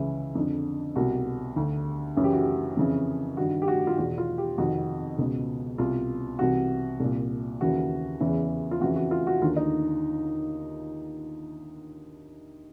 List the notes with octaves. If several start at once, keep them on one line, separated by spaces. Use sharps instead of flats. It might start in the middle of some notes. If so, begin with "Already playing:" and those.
Already playing: C#2 C#3 E3 E4
F2 D3
C2 B2 F#4
D2 D3
F#2 C#3 E3
G4
F#4
G4
F2 C#3 E3
G2 D#3 F#4
G4
F#4
F4
E2 B2 F#4
F4
G4
F2 C3 D#3 F#4
C#2 B2
C2 B2 F4
C2 C3 E3 F#4
C2 A#2
D#2 C#3 E3 F#4
E2 C#3 E3
F4
F2 C#3 E3 F#4
F#4
F4
F#4
D#2 D3 F4
D#4